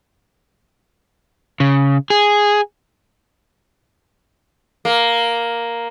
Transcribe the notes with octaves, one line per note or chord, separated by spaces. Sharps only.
C#3
G#4
A#3